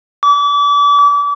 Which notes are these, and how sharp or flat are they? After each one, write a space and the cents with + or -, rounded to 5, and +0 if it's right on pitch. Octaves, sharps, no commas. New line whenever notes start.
D6 -35